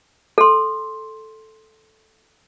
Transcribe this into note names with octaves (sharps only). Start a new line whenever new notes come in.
A4 C6